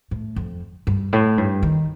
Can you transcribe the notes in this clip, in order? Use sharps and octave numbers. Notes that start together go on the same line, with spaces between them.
A2
F2
G2
A2
G2
D#3